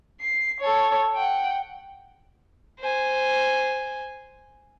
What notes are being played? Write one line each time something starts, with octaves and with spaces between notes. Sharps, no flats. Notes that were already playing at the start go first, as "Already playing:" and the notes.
C7
A4 C#5
F#5 G5
C5 G#5